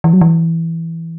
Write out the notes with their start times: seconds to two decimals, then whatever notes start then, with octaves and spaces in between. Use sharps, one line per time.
0.04 E3
0.13 F#3
0.21 E3